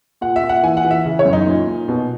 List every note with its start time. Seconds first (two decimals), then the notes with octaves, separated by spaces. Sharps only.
0.21 A#2 F#5
0.36 E5
0.43 A#2
0.49 F#5
0.63 E3 G#5
0.77 F#5
0.84 E3
0.91 E5
1.06 C#3
1.19 C#5
1.25 F#2
1.33 D#4
1.46 A#2
1.67 A#2
1.88 B2